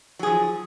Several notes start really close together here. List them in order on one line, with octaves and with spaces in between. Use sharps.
F#3 G#4 F3